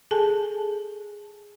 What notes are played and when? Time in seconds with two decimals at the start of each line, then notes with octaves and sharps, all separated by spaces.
0.11 G#4 A4 G#5 A5